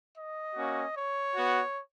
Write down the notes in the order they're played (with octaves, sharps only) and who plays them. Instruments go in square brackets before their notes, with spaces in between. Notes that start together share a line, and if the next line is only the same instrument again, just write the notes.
[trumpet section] D#5
A#3 C#4 F#4
C#5
B3 F#4